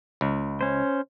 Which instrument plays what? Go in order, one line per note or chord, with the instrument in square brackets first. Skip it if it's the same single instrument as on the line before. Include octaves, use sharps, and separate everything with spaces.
[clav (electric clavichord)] C#2
[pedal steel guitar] C#4 C5